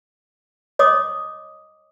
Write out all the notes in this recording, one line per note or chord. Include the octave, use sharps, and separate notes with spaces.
C#5 D#5 D6 D#6